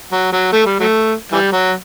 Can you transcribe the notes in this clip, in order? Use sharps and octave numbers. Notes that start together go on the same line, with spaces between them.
F#3
F#3
A3
G3
F#3 A3
E3 G3
F#3